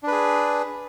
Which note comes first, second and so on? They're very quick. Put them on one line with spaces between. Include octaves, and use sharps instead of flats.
D4 B4 G#4